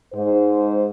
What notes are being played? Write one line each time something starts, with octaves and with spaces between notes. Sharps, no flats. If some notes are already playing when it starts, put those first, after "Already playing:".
G#2 C5